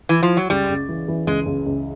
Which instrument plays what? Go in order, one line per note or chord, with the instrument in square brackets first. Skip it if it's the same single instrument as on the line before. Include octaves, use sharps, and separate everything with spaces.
[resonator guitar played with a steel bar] E3
F3
F#3
[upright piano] C#2 [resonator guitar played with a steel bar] G3
[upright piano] C#2
E3
E3
[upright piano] C#2 [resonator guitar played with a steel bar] G#3
[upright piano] C#2
C#2